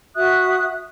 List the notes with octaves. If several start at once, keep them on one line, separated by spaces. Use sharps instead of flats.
F#4 E5 D#6 F#6